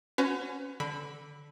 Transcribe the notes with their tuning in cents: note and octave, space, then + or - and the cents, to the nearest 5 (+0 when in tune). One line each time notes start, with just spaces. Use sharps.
C#4 +0 F#4 -5 B4 +45
D3 -5 B5 +0